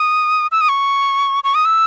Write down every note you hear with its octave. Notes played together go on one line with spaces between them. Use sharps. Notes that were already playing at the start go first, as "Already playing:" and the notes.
Already playing: D#6
E6
D#6
C#6
C#6
D#6
E6